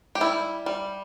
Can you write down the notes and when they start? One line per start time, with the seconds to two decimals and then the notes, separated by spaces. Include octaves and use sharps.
0.15 G4
0.21 G3 E4
0.66 G3